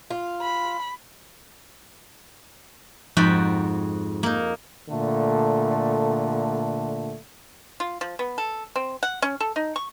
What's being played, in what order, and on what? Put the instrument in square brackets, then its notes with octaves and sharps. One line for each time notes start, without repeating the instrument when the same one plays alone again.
[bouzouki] F4
[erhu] B5
[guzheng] F2 G#2 F#4 G5 B5
A#3 D#4
[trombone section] A#2 D3 A3
[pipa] F4
F3
B3
A4
C4
F#5
C#4
A4
D#4
C#6